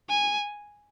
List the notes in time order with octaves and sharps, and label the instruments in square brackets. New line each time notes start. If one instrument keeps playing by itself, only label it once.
[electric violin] G#5